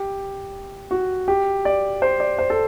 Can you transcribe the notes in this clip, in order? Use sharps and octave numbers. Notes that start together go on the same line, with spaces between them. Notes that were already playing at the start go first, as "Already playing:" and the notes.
Already playing: G4
F#4
G4
D5
C5
D5
C5
A4